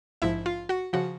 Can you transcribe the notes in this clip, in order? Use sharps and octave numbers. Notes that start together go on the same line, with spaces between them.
A#1 G#2 F3 E4 E5
F4 F5
F#4 F#5
C#3 F3 F#4 F#5